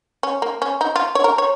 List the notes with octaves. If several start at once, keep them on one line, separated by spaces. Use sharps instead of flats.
C#4
A#3
C#4
D#4
F4
C#5
A#4
C#5